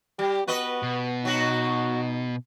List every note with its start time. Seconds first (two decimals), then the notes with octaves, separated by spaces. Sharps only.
0.19 G3 G4
0.48 B3 F#4 B4 D#5
0.83 B2
1.25 F#3 D#4 F#4